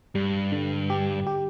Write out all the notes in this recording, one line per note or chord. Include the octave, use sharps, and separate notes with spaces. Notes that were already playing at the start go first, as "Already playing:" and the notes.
G2 G3
D3
G4
G4